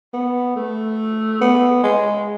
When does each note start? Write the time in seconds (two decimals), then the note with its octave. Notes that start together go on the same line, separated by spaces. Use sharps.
0.14 B3
0.56 A3
1.41 B3
1.83 G#3